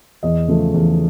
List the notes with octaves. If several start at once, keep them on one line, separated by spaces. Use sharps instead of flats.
E2 D#5
C#3 F3 A3
E2